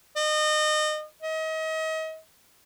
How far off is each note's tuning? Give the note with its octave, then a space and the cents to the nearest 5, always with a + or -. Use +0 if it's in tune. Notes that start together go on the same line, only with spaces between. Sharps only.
D#5 -30
D#5 +35